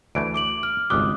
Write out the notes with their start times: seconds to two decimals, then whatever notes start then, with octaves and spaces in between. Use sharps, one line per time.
0.15 D2 E3 A3 D7
0.34 D6 D7 F#7
0.63 F6
0.90 G#1 C#2 G3 D6 D#6 F#6